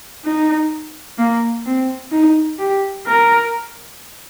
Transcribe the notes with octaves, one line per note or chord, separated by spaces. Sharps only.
D#4
A#3
C4
D#4
G4
A#4